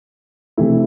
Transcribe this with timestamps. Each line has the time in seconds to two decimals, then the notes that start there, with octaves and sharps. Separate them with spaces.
0.57 C3 E3 A3 E4